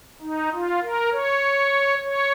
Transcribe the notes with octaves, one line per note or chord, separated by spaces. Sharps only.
D#4
F4
A#4
C#5
C#5